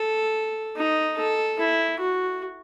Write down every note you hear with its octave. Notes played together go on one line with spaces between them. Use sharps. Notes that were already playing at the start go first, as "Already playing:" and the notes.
Already playing: A4
D#4
A4
E4
F#4